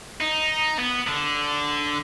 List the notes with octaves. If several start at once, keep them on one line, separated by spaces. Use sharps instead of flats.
D#4
B3
D3 D4